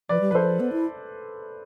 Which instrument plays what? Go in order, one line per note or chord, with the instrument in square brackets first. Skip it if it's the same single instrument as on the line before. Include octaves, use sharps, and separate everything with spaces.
[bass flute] F3 [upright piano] B4 D5
[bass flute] G3
[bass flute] F3 [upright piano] A4 B4 C5
[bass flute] B3
E4